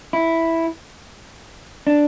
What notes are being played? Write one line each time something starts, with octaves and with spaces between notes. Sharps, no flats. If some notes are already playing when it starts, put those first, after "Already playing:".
E4
D4